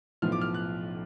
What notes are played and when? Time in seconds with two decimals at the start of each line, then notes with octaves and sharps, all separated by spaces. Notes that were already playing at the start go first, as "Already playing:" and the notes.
0.22 B1 A2 F3 B3 F4 F6
0.32 D6
0.41 F6
0.54 F#6